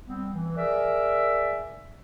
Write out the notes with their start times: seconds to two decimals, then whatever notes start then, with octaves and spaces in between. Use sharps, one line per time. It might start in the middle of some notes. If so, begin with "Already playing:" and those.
0.05 G3 B3 C4
0.32 E3
0.57 G#4 A#4 D5 E5